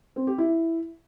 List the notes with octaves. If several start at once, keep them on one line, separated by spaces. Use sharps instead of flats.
C4
G4
E4